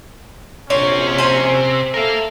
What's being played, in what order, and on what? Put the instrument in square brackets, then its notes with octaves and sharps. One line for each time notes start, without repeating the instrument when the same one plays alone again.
[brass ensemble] A#1 F#2 C#4 [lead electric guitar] C3 [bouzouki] C#5
[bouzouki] C5 G#5
[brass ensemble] A4 E5 [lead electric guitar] A#4 F5